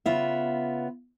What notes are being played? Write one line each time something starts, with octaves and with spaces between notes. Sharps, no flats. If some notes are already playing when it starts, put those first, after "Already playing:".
C#3 B3 F4 E5